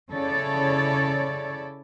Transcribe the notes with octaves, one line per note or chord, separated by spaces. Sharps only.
C#3 E4 A4 C#5 D5